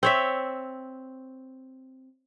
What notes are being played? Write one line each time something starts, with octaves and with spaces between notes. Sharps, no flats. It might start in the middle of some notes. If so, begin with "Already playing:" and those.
C4 C#5 E5